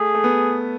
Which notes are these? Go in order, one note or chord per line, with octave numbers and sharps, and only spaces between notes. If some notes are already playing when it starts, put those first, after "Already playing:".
Already playing: A3 G#4
A3
B3